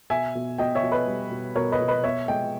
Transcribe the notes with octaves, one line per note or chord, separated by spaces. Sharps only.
B2 E5 G#5
B2
B2 D#5 G5
C#5 E5
B2
B4 D#5
G3
B2
B2 A#4 C#5
B4 D#5
B2
B4 D#5
B3 C#5 E5
G#3 D#5 G5